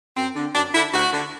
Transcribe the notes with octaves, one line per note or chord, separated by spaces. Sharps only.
F#2 C4
D3
F#2 D4
D3 E4
D2 F#4
D3